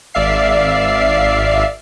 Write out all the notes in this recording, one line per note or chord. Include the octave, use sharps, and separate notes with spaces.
G#1 D5 E5 F5 C7